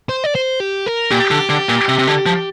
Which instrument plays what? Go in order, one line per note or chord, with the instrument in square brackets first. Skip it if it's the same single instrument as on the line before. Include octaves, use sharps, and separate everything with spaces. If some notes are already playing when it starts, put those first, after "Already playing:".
[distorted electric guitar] C5
D5
C5
G4
A#4
[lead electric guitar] A#2 [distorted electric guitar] G4
[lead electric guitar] D3
D3
A#2
C3
C3
D3
F3